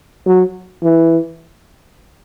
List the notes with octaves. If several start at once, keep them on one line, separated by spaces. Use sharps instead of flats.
F#3
E3